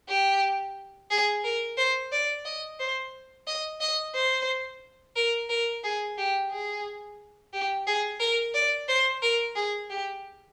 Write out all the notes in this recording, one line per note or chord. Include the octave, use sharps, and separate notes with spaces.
G4
G#4
A#4
C5
D5
D#5
C5
D#5
D#5
C5
A#4
A#4
G#4
G4
G#4
G4
G#4
A#4
D5
C5
A#4
G#4
G4